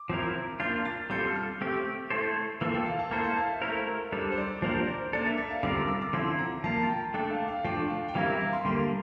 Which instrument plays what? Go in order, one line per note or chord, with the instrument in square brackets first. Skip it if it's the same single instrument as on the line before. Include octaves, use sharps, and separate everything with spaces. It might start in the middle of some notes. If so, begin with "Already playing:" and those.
Already playing: [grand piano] D6
[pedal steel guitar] F3 C4 E4 A#4
[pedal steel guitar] A#3 D4 F4 [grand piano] G6
[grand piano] A6
[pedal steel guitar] G3 C4 F4 A4 [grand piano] G6
[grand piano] F6
[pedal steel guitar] A3 C4 G4
A3 E4 A4 C5
[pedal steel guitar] E3 A#3 F4 A4 [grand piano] E6
[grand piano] G5
F5
A5
[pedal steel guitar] A#3 E4 A4 C5 [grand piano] A#5
[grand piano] A5
F5
E5
[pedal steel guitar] A3 E4 A#4 [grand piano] C5
[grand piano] A#4
[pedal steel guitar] G3 D4 A4 [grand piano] C5
[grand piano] C5
D5
[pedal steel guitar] F3 A#3 D4 G4 A#4 [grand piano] C5
[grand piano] C5
[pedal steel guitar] A#3 D4 A4 [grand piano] D5
[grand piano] E5
E5
F5
[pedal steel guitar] D3 G3 C4 F4 A#4 [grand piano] D6
[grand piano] D6
E6
D6
[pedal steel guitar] D3 F3 C4 E4 [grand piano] C6
[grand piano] A#5
[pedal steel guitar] F3 A#3 F4 [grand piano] A5
[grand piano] G5
[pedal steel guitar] A3 D4 A4 [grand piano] G5
[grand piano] F5
F5
[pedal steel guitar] F3 A3 D4 [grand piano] G5
[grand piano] F5
G5
[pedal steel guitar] E3 G3 C4 E4 A#4 [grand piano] F5
[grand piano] E5
F5
C6
[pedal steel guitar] D3 G3 A#3 [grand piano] C6